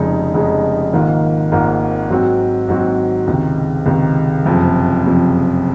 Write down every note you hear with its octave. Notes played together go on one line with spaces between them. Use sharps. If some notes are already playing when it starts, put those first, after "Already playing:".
Already playing: F1 F2 C#3 G#3 D#4
F1 F2 C#3 G#3 D#4
G#1 G#2 D#3 A#3 F4
G#1 G#2 D#3 A#3 F4
G#2 F#3 C4 F#4
G#2 F#3 C4 F#4
C#2 C3 D#3
C#2 C3 D#3
F#1 F2 C3 F3
F#1 F2 C3 F3